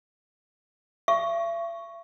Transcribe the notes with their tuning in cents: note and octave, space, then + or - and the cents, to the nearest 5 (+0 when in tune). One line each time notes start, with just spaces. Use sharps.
E5 +45 C#6 +0